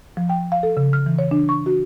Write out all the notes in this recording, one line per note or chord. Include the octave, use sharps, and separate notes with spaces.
F3
G5
F5
A4
C#3
F6
E3
C#5
D4
C#6
F#4